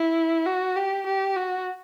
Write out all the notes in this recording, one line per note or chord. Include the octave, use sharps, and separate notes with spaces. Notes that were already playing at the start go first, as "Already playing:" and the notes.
Already playing: E4
F#4
G4
G4
F#4